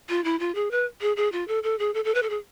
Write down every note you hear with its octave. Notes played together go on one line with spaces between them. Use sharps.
F4
E4
F4
G#4
B4
G#4
G#4
F4
A4
A4
G#4
A4
A4
B4
A4
G#4